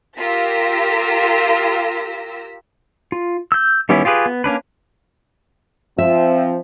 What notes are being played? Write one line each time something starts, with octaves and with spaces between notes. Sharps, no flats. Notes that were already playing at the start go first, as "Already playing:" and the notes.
F4 G4 A#4 E6 A#6 B6
F4
E6 G6
D#3 G3 B3 C#4 E4
F4 G4 G#4 B4
B3
A#3 C#4 D4 B4
F3 C4 E5